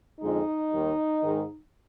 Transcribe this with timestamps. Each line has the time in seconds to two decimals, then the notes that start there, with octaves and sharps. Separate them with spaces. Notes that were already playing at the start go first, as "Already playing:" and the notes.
0.21 F2 D3 F3 G#3 D#4
0.72 D#2 D#3 G3
1.23 G#2 D#3 G#3